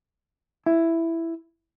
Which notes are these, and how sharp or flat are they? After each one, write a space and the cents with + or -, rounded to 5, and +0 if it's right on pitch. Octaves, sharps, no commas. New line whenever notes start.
E4 +5